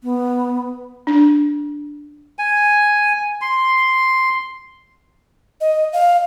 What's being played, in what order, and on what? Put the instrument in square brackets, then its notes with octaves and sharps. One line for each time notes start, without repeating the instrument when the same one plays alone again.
[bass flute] B3
[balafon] D4
[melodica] G#5
C6
[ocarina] D#5
F5